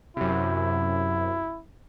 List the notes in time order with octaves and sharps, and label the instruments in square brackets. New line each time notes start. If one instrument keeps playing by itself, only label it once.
[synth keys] F#2 C3 [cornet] E4